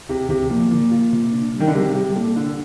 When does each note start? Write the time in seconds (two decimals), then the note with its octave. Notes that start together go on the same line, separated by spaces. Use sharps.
0.09 D2 C3
0.29 D2 C3
0.50 A#2 F3
0.71 A#2 D3
0.91 F4
1.13 C3
1.33 D4
1.54 G3
1.60 D#3
1.67 D3
1.74 C3 G3
1.95 C3 G3
2.16 A#2 A4
2.36 D3 D4